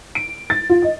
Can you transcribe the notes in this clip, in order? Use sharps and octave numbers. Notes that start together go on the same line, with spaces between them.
D7
A6
F4
D#5